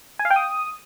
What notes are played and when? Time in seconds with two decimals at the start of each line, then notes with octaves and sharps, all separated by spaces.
0.19 G#5
0.25 F5
0.30 G5
0.36 D#6